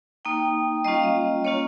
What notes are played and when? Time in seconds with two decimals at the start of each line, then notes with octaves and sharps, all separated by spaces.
0.25 A#3 D#4 G5
0.84 G3 A#3 C#4 F4 D#5
0.94 F5
1.03 D#5
1.44 A#3 C#4 F4 C#5